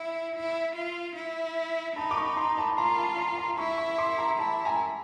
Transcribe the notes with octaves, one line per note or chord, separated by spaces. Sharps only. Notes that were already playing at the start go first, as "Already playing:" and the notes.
Already playing: E4
E4
F4
E4
D#4 A5 B5
D6
B5 C#6
A#5 C6
A5 B5
F4 A#5 C6
A5 B5
A#5 C6
A#5 C6
E4 B5 C#6
B5 C#6
C6 D6
A#5 C6
E4 A5 B5
G#5 A#5